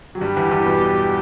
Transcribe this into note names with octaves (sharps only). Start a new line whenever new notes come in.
F#3
G2 G3 G4
E2 E3
E2 E3
B2 B3